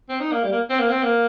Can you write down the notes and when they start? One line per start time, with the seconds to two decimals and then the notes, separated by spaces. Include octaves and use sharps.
0.09 C4
0.20 D#4
0.32 A#3
0.44 G3
0.52 A#3
0.70 C4
0.79 A#3
0.91 C4
1.03 A#3